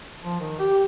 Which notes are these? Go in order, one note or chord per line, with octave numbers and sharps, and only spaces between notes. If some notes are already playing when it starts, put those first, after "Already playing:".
F3
D#3
G4